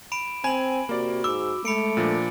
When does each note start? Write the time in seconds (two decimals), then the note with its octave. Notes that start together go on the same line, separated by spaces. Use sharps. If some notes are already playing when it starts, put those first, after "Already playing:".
0.12 B5 D7 E7
0.44 C4 G#5 B5 F#7
0.89 C3 A#3 F#4 D5
1.24 G#2 D6 E6
1.65 G#3 A3 B5 C#7 D7
1.97 A#2 F3 D4